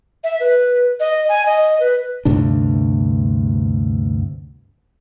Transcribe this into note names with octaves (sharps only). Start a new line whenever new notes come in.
E5
B4
D#5
G#5
D#5
B4
D2 G2 C3 D4